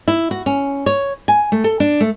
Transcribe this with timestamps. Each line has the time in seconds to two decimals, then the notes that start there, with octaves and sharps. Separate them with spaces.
0.08 E4
0.31 F#4
0.46 C#4
0.86 C#5
1.28 G#5
1.52 A3
1.64 A4
1.80 D4
2.00 A3